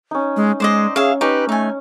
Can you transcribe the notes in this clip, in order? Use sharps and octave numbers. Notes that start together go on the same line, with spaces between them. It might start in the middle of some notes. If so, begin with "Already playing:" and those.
C#4 D#4
G#3
G#3 C5 D5 D#5
C#4 G#4 E5 F5
C#4 D#4 G4 B4
A3 D#4 G#5